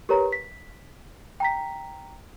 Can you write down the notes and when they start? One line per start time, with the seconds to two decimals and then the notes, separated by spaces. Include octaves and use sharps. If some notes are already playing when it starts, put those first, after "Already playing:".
0.09 G4 A#4 B4 C#5 A#5
0.32 B6
1.40 G5 A#5 B6